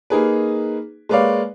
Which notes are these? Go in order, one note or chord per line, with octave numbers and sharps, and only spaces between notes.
A#3 D#4 G#4 B4
G#3 A#3 B4 C#5 D5 F5